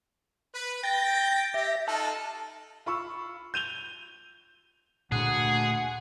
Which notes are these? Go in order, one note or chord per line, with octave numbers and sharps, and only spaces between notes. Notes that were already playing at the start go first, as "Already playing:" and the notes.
B4
G5 A6 A#6
G4 E5 A#6
D#4 F4 A4 A5 F#6
F4 B5 C#6 E6
G6 D#7 F7 G7
D2 A#2 A3 G#4 F#5